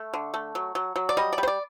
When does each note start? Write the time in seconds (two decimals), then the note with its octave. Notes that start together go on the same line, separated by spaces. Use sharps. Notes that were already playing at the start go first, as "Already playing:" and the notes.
Already playing: A3
0.13 D3
0.34 A3
0.55 F#3
0.75 F#3
0.96 F#3
1.09 D5
1.17 G3 D#5
1.32 D5
1.38 G3
1.43 C5
1.48 D5